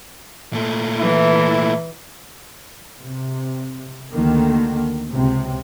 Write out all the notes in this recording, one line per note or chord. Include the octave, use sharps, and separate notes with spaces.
A#2 A3
E3 E4
C3
D2 D3 D#3 A#3
C#2 C3